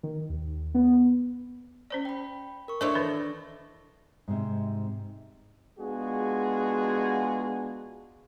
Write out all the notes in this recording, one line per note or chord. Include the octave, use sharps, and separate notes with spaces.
D#3
D#2
B3
C#4 C5 D5
G5 B5
A#4 C#6
D4 E4 A4 C5 C#5 D#5 E5 C6
D#3 E3 B4 A#6
G#2 C3
G#3 B3 D4 F4 F#4 G#4